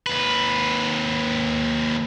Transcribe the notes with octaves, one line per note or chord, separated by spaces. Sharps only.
D#2 B4